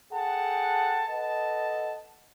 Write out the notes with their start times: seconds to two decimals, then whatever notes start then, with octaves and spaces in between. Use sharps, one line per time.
0.13 G#4 A4 F#5 G5 A5
1.08 A4 B4 D#5 F#5 A5